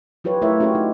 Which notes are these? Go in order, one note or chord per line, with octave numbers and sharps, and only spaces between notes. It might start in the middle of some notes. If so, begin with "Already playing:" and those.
F#3 F4 G4 B4 C#5
A3 E4 F4 A#4 C#5 E5
C#4 F#4 G4 A#4 C#5
D#4